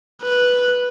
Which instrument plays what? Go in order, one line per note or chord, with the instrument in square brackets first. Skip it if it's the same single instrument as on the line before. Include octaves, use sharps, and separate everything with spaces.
[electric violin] B4